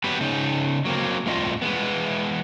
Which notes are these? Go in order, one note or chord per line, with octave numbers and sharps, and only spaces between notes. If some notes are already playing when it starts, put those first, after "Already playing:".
F#3 B3 G4 B4
C#3 D#4
F#3 A#3 C4
F2 A2 G3 F4 D#5
E3 G#3 B3